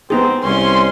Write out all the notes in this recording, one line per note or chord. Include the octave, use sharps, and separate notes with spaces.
B3 C4 D#4 G#4
C2 C#4 C6